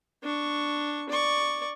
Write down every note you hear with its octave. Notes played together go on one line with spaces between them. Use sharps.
D4 C#6
D5 C#6